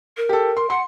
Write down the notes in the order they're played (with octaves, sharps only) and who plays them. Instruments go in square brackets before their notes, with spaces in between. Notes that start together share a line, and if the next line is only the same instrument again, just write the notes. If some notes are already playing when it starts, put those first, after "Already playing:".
[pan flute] A#4
[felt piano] G4 A4
C6
[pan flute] F#5 [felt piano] C6